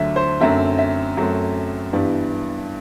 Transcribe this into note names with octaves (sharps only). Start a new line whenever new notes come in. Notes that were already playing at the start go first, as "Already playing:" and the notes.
Already playing: D2 D3 F#3 E5
C5
F#2 D3 F#3 A3 C4 E5
E5
F#2 F#3 A3 C4
G2 E3 G3 B3 D4